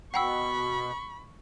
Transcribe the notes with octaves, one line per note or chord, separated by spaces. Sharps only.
B2 F#5 G5 B5 C#6 E6